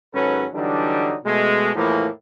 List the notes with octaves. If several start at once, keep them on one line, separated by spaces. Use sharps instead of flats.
G#1 G#2 F#3 C#4 A4 B4
D3 E3 F#3 G3 D4 D#4
B2 G#3 A3
E2 A2 E3 F3 A3 A#3